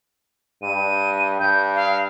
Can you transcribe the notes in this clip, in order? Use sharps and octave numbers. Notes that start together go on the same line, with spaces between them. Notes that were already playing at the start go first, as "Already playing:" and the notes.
G2 D#7
G2 G6
F5